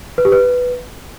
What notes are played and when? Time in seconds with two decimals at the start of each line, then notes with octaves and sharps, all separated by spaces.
0.18 B4
0.25 G4
0.32 B4